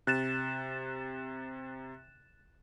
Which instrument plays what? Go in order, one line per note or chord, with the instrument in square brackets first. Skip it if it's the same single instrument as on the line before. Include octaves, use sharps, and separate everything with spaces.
[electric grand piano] C3 [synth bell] F#6 A6 E7